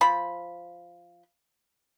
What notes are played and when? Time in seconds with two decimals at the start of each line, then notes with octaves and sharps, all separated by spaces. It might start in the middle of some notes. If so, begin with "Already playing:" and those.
0.01 F3 B5